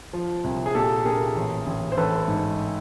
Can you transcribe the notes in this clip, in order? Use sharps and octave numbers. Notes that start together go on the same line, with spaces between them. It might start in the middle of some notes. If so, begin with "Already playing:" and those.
F3
C2
G#4
A#2 G4 A4
A#2 G#4 A#4
A1
A1
C5
A1 A4 B4
G#2